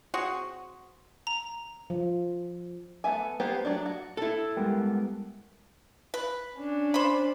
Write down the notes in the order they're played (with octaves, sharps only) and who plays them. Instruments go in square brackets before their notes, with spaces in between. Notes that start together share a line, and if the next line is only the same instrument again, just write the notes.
[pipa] C4 F#4 G#4
[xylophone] A#5
[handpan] F3
[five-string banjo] A3 B3 E5 G#5
A#3 B3 G4 C5
F#3 A3 D4
F#4
[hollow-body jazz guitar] E4 A4
[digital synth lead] G3 [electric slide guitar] G#3 B3 A#4
[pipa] B4
[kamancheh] C#4 D4
[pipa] C5 B5